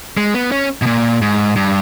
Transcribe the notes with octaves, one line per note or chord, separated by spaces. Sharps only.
G#3
B3
C#4
B2
A#2
G#2
G2